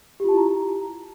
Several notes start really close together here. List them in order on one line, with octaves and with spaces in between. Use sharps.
G4 F4 A5 E4 A#5